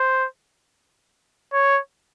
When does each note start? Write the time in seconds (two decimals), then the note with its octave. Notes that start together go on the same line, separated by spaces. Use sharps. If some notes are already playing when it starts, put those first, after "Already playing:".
Already playing: C5
1.53 C#5